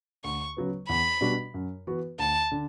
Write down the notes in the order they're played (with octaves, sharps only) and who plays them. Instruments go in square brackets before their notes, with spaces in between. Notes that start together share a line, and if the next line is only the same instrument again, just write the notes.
[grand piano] D2 [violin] C#6
[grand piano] C#3 F#3 B3
[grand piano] E2 [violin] B5
[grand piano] B2 G3 D4 F#4
F#2
E3 B3 F#4 B4
[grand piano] D2 [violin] A5
[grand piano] D3